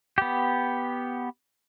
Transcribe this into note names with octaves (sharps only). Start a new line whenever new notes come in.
B3 G4